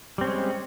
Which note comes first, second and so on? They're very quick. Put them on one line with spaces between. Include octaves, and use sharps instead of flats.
G3 C4 C#4 G#3